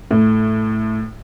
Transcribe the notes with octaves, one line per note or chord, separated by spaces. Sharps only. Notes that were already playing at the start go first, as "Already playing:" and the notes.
A2